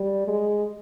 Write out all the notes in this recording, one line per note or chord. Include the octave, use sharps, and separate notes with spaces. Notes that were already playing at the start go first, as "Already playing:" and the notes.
Already playing: G3
G#3